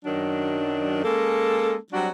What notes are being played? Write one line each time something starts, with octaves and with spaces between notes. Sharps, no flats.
F#2 D#3 F#3 D4
G#3 A#3 C#4 A4
F#3 G3 C4 D4 F#4